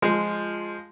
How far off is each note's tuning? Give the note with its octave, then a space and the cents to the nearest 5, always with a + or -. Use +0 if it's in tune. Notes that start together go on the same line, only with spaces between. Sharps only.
F3 +0 G#3 +0 F4 +0